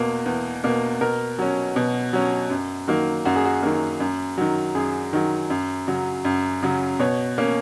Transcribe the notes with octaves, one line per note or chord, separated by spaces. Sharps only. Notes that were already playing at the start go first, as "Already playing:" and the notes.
Already playing: E2 B2 A#3
E2
B2 A#3
B2 A#4
F#3 C#4
B2
F#3 C#4
F#2
D#3 F#3 A#3
F#2 F#4
G#4
F#4
D#3 F#3 A#3
F#2
D#3 F#3
F#2 G#4
D#3 F#3
F#2
C#3 F#3
F#2
C#3 F#3
B2 C#5
A#3 C#4